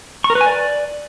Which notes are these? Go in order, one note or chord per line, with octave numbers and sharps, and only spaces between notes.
C#6
A#4
B4
G#5
D5